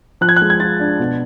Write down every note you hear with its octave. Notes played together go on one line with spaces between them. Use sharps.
F3 F#6
G#6
F#6
G#3
G#6
F4 A6
D4
B2